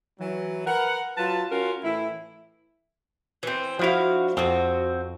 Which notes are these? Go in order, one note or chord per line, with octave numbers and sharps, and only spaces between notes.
E3 F#3
A#4 B4 F#5
F#3 F4 B4 A5
C#4 F4 F#4 A#4 F5
A2 E3 E4
E3 C4
F3 D4 E4 F#4 F5
F2 C4 F#4